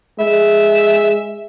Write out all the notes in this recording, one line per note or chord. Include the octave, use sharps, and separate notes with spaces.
G#3 E5